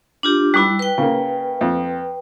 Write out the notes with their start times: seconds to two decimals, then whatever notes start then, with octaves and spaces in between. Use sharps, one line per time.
0.23 D4 F4 G4
0.54 G3 E4 B5 D6 F#6
0.79 B4 G5
0.98 C#3 A#3
1.61 F2